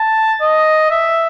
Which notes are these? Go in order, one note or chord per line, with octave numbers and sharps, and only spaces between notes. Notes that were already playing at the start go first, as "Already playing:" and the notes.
Already playing: A5
D#5
E5